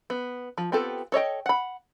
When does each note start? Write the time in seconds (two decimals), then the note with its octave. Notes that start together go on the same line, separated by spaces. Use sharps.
0.10 B3
0.58 F3
0.72 B3 C4 F4 G4 A4
1.12 A4 C#5 D#5 G5
1.46 F#5 B5